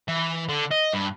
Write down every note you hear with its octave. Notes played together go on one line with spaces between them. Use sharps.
E3
D3
D#5
G2